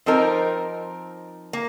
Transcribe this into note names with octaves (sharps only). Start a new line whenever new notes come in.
F3 C4 D#4 A#4
A#3